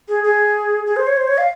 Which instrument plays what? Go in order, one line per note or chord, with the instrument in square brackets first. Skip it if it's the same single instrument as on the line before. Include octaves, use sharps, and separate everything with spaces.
[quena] G#4
G#4
G#4
C5
C#5
C5
C#5
F5